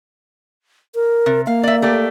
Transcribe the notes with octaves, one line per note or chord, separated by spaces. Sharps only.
A#4
C3
A#3 F5
D5 E5
A3 G4 D5